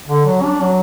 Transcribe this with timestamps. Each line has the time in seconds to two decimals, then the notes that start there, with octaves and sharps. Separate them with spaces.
0.08 D3
0.25 F#3
0.43 D4
0.61 F#3